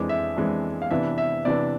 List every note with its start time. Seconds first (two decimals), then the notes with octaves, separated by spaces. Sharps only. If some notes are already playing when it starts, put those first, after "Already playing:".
Already playing: F2 E3 G#3 D4 D6
0.09 E5
0.36 F2 E3 G#3 D4
0.82 F5
0.91 C3 E3 B3 D4 E5
1.18 E5
1.45 C3 E3 B3 D4 D5